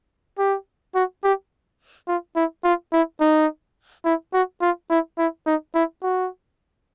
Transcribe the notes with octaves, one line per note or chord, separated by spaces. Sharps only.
G4
F#4
G4
F4
E4
F4
E4
D#4
E4
F#4
F4
E4
E4
D#4
E4
F#4